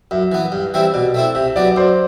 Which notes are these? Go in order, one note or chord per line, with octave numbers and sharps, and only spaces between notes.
F#2 E5
E3 B3
G2
E3 G3 C4 E4
B2 D5
A3 C4 E4
C3 E5
F#3 B3 D5
D5
F#2 C5